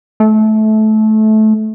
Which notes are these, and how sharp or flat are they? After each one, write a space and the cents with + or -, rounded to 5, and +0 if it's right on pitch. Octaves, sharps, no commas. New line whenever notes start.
A3 -20